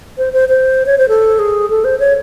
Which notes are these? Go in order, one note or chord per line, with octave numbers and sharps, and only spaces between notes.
C5
C5
C5
C#5
C5
A4
G#4
A4
C5
C#5